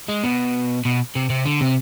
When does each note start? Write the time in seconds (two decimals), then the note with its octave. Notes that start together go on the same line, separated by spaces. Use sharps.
0.09 G#3
0.24 B2
0.85 B2
1.16 C3
1.30 C3
1.46 D3
1.61 C3